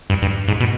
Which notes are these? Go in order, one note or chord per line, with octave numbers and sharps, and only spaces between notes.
G2
G2
G#2
B2